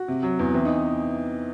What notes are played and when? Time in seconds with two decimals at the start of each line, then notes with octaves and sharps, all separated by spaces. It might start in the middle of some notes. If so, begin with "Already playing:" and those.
Already playing: F#4
0.08 C3
0.23 F#3
0.39 E2
0.54 E3 C4
0.65 D#4